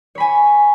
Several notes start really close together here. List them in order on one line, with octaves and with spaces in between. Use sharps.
C#5 B5 G#5